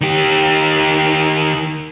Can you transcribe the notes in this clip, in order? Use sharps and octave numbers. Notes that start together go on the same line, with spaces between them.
D#3 G4